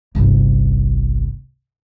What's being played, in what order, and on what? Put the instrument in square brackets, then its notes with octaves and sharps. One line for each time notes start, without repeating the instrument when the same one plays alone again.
[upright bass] G1 C2